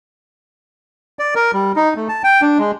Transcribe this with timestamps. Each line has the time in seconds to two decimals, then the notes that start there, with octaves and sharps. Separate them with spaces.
1.19 D5
1.35 A#4
1.53 G3
1.76 D#4
1.96 A3
2.09 A5
2.24 G5
2.42 D4
2.58 G#3